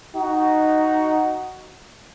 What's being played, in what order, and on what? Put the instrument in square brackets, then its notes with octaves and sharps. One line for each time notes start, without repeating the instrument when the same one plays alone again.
[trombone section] D#4 F#4